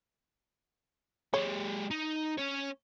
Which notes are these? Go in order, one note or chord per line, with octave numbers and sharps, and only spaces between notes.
G#3 G4 C#5
D#4
C#4 C#5